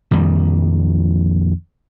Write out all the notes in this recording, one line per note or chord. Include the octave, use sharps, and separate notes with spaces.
A#1 F2 D#3 G3